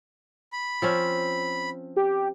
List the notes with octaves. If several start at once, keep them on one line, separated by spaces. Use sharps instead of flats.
B5
F3 C4 C#4
G4